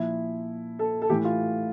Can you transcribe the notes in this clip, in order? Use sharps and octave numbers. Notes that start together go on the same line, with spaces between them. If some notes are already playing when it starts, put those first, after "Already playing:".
Already playing: A#2 F3 E4
A4
A4
A2 E3 G4
F4